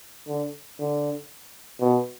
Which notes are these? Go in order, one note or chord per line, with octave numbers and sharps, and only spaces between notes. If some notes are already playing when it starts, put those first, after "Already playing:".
D3
D3
B2